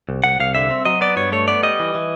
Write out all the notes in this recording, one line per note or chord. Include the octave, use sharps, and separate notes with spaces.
C2
C2 F#5
C2 F5
D3 E5
C4
F#3 D#5
B3 D5
G2 C#5
A3 C#5
B3 D5
G3 D#5
E3
E3